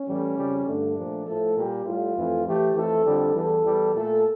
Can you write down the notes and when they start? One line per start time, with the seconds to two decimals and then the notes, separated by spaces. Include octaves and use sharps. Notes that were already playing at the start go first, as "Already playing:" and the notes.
Already playing: C#4
0.08 A2 E3 G3
0.38 F2 C#3 G3
0.67 G2 D3 A3 D4
0.98 A#2 F3 A3
1.27 A2 F3 A3 A4
1.57 A#2 G3 G4
1.86 A2 G3 F4
2.16 F2 E3 A3
2.46 A2 E3 A3 G4
2.75 F2 E3 A3 A4
3.05 F2 D3 G3
3.35 E2 E3 G3 A4
3.65 E2 E3 G3
3.95 A#2 A3 A4